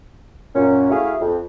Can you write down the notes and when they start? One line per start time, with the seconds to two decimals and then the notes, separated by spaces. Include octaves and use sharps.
0.55 F#2 A#2 C#4
0.90 A3 E4 F#4 G#4 F5
1.20 F2